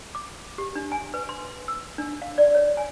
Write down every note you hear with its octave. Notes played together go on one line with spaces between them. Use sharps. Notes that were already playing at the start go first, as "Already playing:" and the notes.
D6
G4
D4
G#5
B4
C6
E6
D4
F5
D5
C#5
G#5